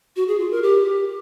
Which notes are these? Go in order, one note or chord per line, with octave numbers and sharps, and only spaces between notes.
F#4
G#4
F4
A#4
G4